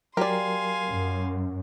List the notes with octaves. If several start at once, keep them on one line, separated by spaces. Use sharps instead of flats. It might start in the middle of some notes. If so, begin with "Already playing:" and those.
F#3 G4 A#4 D5 F5 G#5 C6
F#2